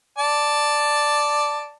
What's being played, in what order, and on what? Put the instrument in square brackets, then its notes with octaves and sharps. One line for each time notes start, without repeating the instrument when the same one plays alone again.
[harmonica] D5 A5